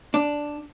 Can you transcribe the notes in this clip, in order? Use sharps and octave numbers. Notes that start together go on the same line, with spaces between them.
D4